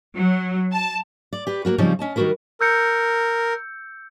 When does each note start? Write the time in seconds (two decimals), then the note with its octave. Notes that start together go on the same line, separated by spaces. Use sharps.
0.16 F#3
0.72 A5
1.33 D5
1.47 G4 B4
1.65 A#3 C4 F#4 A#4
1.78 C#3 F3 G3 C4 C#4 D#4
1.99 C#4 D#5 A5
2.16 D#3 G3 D#4 F#4 A#4 B4
2.61 A#4 E6 G6 C#7